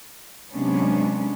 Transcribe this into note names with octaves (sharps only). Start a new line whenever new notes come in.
C3 F#3 G#3 B3 C#4 D4